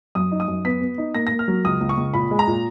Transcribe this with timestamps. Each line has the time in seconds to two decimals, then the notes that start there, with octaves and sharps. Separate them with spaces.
0.15 F#2 D#6
0.32 D#4
0.40 D#6
0.48 F#2
0.65 B3 B6
0.81 B3
0.98 D#4
1.15 A#3 A#6
1.27 A#3 A#6
1.39 F6
1.48 F#3
1.65 C#2 D#6
1.81 C#2
1.89 C#6
1.97 C#2
2.14 A#2 B5
2.31 G#3
2.39 A#5
2.47 A#2